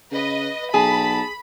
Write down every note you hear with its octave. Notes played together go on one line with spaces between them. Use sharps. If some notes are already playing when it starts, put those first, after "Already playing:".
C#3 B4 D#5
B1 G#4 A5 B5